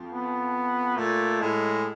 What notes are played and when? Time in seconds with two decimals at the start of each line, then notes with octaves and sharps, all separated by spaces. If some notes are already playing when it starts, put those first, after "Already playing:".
Already playing: F2
0.13 B3
0.97 A#2 A3
1.40 A2 G#3